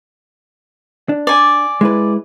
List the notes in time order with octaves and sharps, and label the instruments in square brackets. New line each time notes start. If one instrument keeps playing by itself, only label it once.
[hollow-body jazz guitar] D4
[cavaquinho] D5 G#5
[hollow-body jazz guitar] G#3 E4 B4